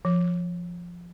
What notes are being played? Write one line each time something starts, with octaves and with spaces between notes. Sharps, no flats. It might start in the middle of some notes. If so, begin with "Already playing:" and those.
F3